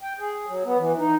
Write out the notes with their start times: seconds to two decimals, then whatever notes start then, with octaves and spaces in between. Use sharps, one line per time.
0.01 G5
0.19 G#4
0.47 F#3
0.65 B3
0.78 E3
0.98 D#4